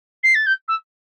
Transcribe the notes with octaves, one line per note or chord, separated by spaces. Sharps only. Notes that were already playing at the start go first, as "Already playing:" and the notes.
C7
A6
G6
E6